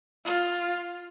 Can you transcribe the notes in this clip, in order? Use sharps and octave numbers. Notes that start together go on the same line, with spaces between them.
F4